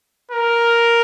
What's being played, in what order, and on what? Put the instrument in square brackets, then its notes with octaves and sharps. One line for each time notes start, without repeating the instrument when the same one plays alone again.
[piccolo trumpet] A#4